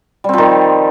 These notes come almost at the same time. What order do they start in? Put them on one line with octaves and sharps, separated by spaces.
G3 C4 F3 D#3